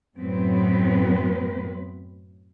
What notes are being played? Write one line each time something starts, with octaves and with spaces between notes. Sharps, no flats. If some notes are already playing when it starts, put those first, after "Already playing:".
F#2 A2 F#3 B3 C4 B4